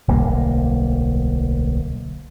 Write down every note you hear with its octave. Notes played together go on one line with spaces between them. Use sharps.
D1 B1 G3 A#3